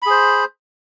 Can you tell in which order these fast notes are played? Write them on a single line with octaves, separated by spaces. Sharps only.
B5 G#4 C5